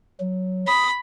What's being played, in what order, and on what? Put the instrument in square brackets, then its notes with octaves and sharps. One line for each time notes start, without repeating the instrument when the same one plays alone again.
[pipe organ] F#3
[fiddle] B5 [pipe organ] D#6